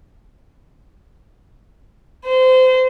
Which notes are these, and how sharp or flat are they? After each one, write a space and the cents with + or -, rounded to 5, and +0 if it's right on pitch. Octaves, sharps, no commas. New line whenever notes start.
C5 -25